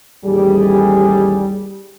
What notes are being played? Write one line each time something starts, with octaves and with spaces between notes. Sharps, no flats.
A1 D#2 G3 G#4